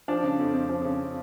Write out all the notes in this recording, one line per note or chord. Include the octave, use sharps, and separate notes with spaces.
F3 D4
C#3
F2
F2
F3
C#3